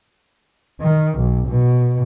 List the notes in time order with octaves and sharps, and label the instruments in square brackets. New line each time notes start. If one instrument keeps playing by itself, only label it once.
[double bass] D#3
B1
B2